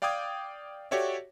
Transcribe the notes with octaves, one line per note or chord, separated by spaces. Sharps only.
D5 F5 G5 D6 D#6 G#6
F#4 G4 A4 C#5 D5 E5